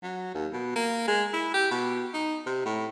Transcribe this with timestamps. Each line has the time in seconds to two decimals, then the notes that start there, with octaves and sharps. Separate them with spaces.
0.03 F#3
0.34 D#2
0.53 B2
0.76 A#3
1.07 G#3
1.33 E4
1.54 G4
1.71 B2
2.14 D#4
2.46 C3
2.65 A2